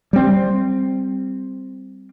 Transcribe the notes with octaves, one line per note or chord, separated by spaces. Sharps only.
G3 C4